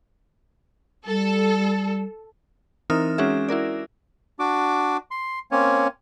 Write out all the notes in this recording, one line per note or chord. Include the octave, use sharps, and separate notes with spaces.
G3 A4
E3 C4 D#4 A#4 D#6 F6
G#3 C#4 F#4 G#4 E5
E4 F#4 A#4 D5
D4 F#4 D6
C6
A#3 C4 C#4 C#5